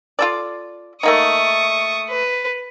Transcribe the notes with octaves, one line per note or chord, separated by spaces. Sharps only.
F4 A4 D5
A3 A#3 D#4 C#6 D#6
B4